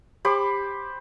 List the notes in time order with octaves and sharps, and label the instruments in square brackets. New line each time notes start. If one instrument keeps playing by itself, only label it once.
[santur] G4 C5 B5 D6